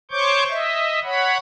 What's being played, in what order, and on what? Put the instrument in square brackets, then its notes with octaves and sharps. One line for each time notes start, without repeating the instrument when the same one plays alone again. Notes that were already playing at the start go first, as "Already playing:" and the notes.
[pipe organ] C5 C#5 C#6 D6 G6
D#5 E5
C#5 F#5 B5